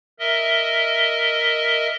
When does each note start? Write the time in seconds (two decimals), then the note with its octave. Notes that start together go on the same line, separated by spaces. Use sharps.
0.19 A#4 D#5 E5